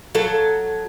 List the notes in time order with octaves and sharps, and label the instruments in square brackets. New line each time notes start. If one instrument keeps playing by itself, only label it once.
[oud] F#3 A4